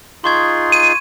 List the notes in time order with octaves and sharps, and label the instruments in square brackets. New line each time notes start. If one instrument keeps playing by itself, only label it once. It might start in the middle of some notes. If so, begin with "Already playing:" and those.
[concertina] D#4 F4 G#4 [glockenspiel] C6 C#6 G#6
[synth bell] D#7